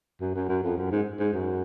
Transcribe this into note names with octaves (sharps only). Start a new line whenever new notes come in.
F#2
F#2
F#2
F2
F#2
G#2
G#2
F#2